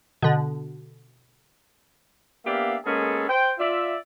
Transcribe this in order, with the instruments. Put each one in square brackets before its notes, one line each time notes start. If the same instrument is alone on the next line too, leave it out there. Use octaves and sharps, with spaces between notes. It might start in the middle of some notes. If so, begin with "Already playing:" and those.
[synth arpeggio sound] B2 D3
[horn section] A#3 B3 D4 G4 E5 F5
G#3 A#3 B3 C#4 G#4 A4
C5 G5
F4 D5 E5